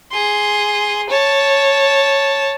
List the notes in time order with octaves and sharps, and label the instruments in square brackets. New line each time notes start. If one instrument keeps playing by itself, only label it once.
[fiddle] G#4 C6
C#5 A5